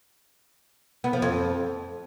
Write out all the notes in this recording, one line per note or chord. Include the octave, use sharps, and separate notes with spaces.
B3
F3
F2